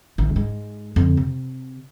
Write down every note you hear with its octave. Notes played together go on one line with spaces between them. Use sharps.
A1 D#3
G#2 G#3
F2 D3
C3